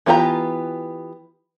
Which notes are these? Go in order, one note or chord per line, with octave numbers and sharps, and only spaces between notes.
E3 B3 F4 G4 A#5